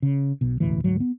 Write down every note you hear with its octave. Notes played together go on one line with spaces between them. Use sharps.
C#3
B1 B2
E1 A1 D2 E3
D2 G#2 F#3
B3